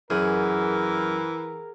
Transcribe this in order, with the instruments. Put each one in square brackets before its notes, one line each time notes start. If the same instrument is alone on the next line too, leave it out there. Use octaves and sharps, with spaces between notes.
[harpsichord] F#2 [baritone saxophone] E3 [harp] G#4 F#5 [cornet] A#4